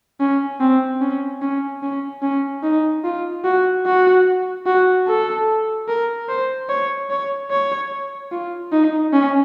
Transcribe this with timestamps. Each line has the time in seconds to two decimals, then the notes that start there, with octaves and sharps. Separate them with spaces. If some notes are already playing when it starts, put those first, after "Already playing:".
0.20 C#4
0.60 C4
1.01 C#4
1.42 C#4
1.83 C#4
2.22 C#4
2.63 D#4
3.04 F4
3.44 F#4
3.86 F#4
4.66 F#4
5.07 A4
5.88 A#4
6.29 C5
6.69 C#5
7.10 C#5
7.50 C#5
8.32 F4
8.72 D#4
9.13 C#4